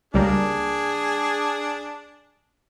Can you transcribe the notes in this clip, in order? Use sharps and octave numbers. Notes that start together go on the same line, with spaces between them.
C#2 G3 A#3 D4 G#4